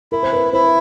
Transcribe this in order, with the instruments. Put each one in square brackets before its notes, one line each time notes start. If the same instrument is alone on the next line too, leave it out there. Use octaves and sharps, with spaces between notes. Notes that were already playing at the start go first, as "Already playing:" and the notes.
[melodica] E4 [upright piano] A#4
[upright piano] C5
B4
[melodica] E4 [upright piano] C5